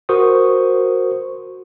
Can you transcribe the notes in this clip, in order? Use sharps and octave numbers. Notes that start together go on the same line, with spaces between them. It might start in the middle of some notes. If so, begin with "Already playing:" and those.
F#4 A#4 C5 C#6 D#6